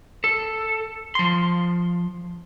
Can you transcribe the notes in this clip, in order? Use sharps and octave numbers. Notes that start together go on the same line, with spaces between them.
A4
F3 C6